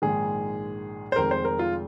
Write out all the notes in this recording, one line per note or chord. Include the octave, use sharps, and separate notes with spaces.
A#1 G#2 D#3 G#3 G#4
C5
F1 F2 D#3 G#3 A#4
C5
A#4
F4